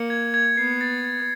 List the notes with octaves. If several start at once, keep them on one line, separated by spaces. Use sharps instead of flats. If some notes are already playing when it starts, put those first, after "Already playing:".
Already playing: A#3 C#7
G#6
G#6
B3 C7
A6
A6